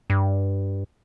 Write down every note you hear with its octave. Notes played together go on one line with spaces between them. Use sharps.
G2